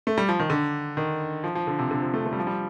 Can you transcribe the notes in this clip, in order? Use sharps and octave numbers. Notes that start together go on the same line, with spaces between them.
A3
G3
F3
D#3
D3
D#3
F3
F3
D3
C3
D3
F3
A3
A3
G3
F3
G3